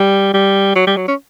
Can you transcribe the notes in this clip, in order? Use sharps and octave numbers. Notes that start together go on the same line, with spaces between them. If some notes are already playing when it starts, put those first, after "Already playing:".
Already playing: G3
G3
F#3
G3
F#3
C#4